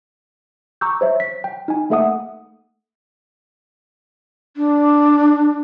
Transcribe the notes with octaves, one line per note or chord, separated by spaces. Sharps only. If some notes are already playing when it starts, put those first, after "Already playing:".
A#5 C#6 D6 E6 G6
C5 C#5 E5
B6
G5
D#4 G#5
A3 A#3 A4 E5 F#5 D#6
D4